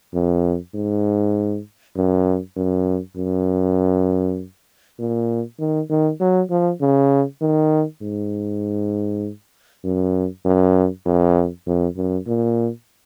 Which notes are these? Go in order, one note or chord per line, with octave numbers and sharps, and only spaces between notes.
F2
G#2
F#2
F#2
F#2
A#2
D#3
D#3
F#3
F3
C#3
D#3
G#2
F#2
F#2
F2
F2
F#2
A#2